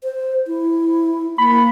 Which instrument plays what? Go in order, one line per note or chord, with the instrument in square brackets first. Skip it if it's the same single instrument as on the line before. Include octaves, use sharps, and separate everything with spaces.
[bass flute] C5
E4
[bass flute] A#3 [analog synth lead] B5